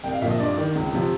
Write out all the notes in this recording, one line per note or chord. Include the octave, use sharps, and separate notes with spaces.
C2 G5
F5
A#2 F3 D#5 E5
G2 D5
D#3
C#2
C3 F3